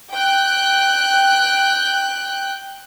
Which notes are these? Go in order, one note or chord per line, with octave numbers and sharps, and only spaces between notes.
G5 F#6